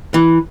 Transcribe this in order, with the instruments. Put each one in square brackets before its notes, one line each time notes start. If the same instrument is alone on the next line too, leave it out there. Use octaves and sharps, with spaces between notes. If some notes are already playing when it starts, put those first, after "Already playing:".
[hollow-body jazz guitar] E3